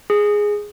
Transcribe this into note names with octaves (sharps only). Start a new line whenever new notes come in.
G#4